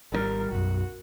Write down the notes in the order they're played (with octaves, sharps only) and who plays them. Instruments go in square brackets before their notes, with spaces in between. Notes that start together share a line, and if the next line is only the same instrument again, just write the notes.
[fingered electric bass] G#1 D3 G3 [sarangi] A#4
[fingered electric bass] B1 F#2 [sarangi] F#4